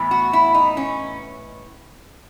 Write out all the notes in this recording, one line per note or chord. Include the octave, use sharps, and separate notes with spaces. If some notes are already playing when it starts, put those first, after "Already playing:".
Already playing: A2 E3 B3
F#4
E4
D#4
C#4